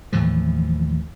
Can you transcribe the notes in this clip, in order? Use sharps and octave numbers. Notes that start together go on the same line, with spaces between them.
D#2 A2 E3 F3